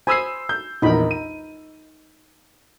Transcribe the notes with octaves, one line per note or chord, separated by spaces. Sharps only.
C5 G#5 B5 D#6 E6 C7
G6
A#1 E2 D#4 A#4 B5
D#7